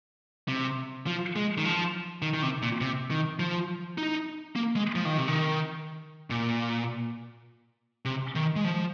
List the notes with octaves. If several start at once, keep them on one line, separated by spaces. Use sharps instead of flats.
C3
F3
G#3
D#3
F3
D#3
D#3
C3
A#2
C3
D#3
F3
D#4
A#3
G#3
F3
D#3
C3
D#3
A#2
C3
D#3
G#3
F3